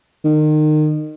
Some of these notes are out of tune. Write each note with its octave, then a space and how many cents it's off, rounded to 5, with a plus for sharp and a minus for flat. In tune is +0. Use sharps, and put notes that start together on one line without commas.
D#3 -30